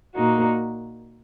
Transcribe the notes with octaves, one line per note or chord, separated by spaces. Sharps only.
A#2 A#3 D#4 F#4